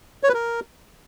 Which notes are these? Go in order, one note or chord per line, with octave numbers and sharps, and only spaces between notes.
C#5
B4
A#4